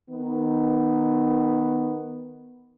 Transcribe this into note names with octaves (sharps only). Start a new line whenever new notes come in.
D#3 B3